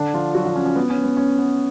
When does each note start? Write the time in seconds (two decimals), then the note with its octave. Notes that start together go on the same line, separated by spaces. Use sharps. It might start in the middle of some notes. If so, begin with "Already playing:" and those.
Already playing: D3 D4
0.14 F3 F4
0.34 F#3 F#4
0.45 F3 F4
0.56 C#4
0.66 C#4
0.76 B3
0.90 C#4
1.04 B3
1.17 C#4
1.39 B3